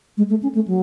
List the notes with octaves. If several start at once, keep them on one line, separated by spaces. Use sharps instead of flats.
G#3
A3
C#4
A3
F#3